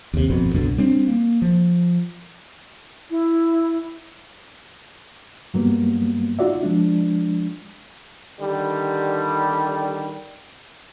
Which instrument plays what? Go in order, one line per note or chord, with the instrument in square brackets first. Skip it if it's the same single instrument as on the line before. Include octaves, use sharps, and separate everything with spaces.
[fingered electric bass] D#2 C3
G1 F2 B2
C2 F#2 B2 D3
G3 C4 D4
A#3
F3
[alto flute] E4
[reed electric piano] G2 F#3 G3 A#3 B3
D#4 F4 F#4 D5 E5
F3 G#3 D4
[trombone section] D3 D#3 G3